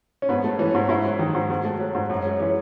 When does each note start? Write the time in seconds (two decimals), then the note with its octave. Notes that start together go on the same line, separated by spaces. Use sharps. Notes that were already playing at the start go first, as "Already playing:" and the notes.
0.22 C#4
0.29 G#2 B3
0.44 A3
0.59 E3 C#4
0.75 G#2
0.89 G#2 E4
1.04 F#3
1.19 D#3
1.35 G#2
1.50 G#2 F#4
1.64 A3
1.80 F#3
1.95 G#2
2.09 F#2 C#4
2.20 G#3 C#4
2.39 E3 C#4